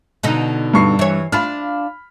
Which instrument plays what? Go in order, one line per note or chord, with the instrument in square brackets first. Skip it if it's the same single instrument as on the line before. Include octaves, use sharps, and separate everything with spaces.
[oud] B2 D3 D#4
[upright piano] G2 C#6 C7
[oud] E3 C#5
[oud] D4 F4 [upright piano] B5 F6